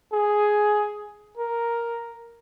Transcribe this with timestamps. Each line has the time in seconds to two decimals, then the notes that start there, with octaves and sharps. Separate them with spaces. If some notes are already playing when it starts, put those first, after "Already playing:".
0.12 G#4
1.37 A#4